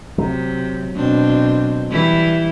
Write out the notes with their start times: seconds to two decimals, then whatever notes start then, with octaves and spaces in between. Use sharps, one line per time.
0.18 C3 F#3
0.95 B2 C4 D4
1.90 E3 G3 E4